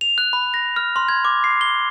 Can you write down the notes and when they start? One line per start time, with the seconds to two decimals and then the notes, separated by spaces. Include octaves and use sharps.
0.01 F7
0.18 F#6
0.33 B5
0.54 A#6
0.76 F6
0.96 C6
1.09 G#6
1.25 D6
1.44 C7
1.61 G7